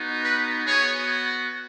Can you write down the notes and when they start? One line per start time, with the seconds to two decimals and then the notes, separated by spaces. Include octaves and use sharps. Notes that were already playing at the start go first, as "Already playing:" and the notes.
Already playing: B3 D#4 F#4
0.24 B4
0.66 B3 F#4 G#4 C#5